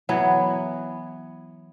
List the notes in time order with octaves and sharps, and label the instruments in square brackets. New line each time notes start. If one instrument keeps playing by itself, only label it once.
[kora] E3 F#3 B3